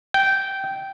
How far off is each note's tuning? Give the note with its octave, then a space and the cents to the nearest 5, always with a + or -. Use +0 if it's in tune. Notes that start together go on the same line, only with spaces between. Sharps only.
G5 -10